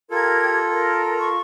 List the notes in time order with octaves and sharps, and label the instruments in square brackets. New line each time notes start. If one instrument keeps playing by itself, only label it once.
[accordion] F4 A4 [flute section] G4 A#4 G#6
[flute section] A#4
C6 C#6